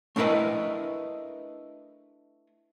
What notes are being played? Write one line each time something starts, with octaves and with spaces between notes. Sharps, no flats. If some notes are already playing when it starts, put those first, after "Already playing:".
A3 D4 E4 A#4 B4 D#5